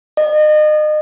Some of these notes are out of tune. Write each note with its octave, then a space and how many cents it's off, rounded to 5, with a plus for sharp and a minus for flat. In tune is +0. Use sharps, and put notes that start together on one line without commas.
D#5 -35